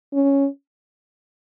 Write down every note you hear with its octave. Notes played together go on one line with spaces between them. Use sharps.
C#4